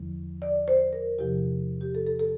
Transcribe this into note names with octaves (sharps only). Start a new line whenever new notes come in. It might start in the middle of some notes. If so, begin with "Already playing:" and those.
Already playing: E2 D3 F3
D5
C5
A#4
E2 C3 F3 G4
G4
A4
A4
A4